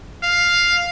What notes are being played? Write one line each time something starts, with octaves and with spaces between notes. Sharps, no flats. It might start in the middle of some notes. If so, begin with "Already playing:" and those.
F5